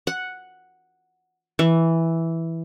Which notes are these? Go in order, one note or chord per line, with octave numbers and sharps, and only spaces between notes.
F#5
E3